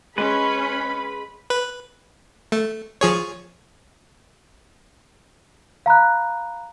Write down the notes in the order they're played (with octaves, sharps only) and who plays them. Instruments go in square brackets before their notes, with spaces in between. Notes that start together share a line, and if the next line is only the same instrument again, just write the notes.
[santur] G#3 [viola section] C#4 [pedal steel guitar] B4 [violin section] B5
[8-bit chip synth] B4
A3
F3 G#4 C#5
[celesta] F5 A#5 B5 F#6